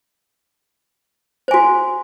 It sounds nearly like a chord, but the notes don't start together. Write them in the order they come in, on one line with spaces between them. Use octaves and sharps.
C5 G#5 F#4